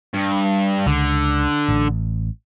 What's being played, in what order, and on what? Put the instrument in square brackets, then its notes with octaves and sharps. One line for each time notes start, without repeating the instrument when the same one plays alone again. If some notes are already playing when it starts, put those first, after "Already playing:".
[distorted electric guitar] G2
[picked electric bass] C#2 [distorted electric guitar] D3
[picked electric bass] A1